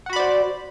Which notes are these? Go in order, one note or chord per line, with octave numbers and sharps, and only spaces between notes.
F#4 C5 D5 F#5 B5